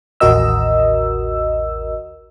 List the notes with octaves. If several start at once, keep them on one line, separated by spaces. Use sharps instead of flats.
A1 D#2 F#4 A#4 D#5 E6